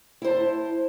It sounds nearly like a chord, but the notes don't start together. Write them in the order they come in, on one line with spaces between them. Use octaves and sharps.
E4 C5 A5